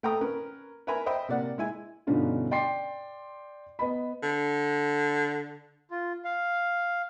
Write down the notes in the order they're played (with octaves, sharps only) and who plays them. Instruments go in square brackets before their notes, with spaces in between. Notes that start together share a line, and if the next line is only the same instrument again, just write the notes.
[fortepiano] A3 G5 A#5 D#6
C#4 A#4 B4
A#4 B4 E5 G#5 A#5 B5
C5 D#5 E5 G5 B5
C3 A#3 D5 F#5
G#3 E4 G#5
[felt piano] G2 B2 D3 C#4 D#4 F4
D5 G5 C6 C7
B3 D#5 B5
[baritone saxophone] D3
[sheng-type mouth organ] F4
F5